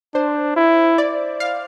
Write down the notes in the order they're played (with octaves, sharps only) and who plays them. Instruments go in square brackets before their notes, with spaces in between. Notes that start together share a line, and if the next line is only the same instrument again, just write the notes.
[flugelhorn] D4 [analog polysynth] C5
[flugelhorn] E4
[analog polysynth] D5
F5